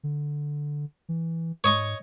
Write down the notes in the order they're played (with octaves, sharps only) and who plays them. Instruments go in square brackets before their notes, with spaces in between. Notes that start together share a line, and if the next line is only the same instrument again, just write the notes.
[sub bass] D3
E3
[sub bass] G#2 [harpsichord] C#5 D#5 C#6